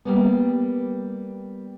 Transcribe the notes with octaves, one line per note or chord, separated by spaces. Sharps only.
G3 A#3 B3